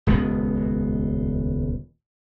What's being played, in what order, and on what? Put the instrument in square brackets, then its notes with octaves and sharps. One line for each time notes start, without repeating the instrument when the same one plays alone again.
[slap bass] D#1 C#2 G#3 B3